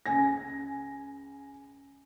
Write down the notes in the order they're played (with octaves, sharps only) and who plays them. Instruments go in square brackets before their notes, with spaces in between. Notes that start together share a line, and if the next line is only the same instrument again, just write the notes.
[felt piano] C#2 G#5 A#6